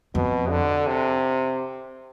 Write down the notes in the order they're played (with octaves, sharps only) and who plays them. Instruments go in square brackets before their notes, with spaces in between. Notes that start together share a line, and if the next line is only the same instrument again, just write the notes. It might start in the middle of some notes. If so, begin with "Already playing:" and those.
[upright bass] F2 [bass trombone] B2
[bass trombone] D3
C3